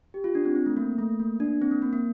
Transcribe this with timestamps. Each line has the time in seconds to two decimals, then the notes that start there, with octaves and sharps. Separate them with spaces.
0.14 G4
0.24 F4
0.35 D4
0.45 C4
0.56 C4
0.66 A3
0.77 A#3
0.99 A3
1.20 A#3
1.40 D4
1.62 C4
1.71 A#3
1.82 A#3
1.93 A#3